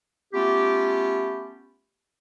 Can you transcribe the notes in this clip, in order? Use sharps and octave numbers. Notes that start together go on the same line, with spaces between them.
A3 B3 C#4 F4 G4